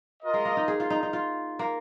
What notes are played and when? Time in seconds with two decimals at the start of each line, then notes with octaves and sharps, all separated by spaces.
0.22 F4 A#4 D#5
0.34 G#3
0.45 A#3
0.57 D#4
0.68 G#4
0.80 F4
0.90 D#4
1.03 D#4
1.13 F4
1.59 A#3